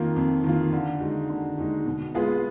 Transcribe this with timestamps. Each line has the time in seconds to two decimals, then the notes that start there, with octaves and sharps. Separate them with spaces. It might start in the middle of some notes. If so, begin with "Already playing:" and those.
Already playing: F2 D#3 A#3 F4
0.16 F2
0.44 D#3 A#3 F4
0.73 D3
1.00 G#3 D#4 F#4
1.29 D3
1.58 G#3 D#4 F#4
1.86 B2
2.14 G#3 B3 F4 G#4